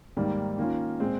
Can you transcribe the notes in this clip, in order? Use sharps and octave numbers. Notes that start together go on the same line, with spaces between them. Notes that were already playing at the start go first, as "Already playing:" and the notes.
G#2 D#3 G3 A#3
D#3 A#3 C#4 F4
A#2 G#3 C4